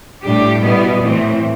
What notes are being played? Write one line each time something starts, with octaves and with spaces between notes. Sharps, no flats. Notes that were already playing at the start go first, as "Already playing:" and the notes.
A2 G3 D4 G4
B2 G3 B3 E4
A2 E3 A3 C4